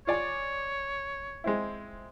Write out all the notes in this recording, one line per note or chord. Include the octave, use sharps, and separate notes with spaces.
F4 C#5 D5 G#5
G#3 C4 E4